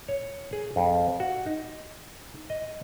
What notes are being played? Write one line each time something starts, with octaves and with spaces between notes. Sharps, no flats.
C#5
G#4
F2
F#4
D#4
D#5